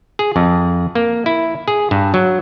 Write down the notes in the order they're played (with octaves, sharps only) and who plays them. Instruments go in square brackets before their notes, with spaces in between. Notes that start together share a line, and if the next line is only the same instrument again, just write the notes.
[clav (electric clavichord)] G#4
F2
A#3
E4
G#4
G2
F#3